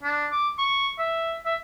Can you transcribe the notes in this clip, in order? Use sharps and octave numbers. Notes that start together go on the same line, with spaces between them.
D4
D6
C#6
E5
E5